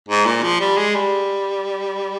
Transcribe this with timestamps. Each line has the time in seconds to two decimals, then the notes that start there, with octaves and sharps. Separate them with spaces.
0.09 G#2
0.26 A#2
0.43 F3
0.60 G3
0.77 G#3
0.95 G3